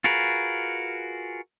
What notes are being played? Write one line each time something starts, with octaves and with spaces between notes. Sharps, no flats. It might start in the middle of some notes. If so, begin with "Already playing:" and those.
F4 F#4 G#4 A#4 B4